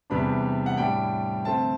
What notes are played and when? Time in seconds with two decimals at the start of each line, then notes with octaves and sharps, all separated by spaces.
0.10 E2 C3 G3 B3 D4 B5
0.66 F#5
0.77 A2 G3 D4 G5
1.45 D3 A3 C4 A5